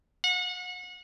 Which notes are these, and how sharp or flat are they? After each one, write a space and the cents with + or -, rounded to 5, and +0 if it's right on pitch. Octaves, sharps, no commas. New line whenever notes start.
F#5 -35